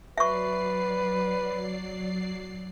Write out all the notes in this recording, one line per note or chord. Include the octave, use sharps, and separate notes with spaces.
F#3 B4 D5 E5 C#6 C7